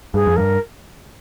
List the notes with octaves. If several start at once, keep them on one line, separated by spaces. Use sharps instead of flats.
G2 G#4
F2
G2 A#4